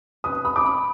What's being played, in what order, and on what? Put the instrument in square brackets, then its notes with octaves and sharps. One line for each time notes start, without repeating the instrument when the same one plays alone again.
[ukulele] B4 [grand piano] D#6
[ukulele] B5 [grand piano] D#6
[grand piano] D6
[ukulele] B5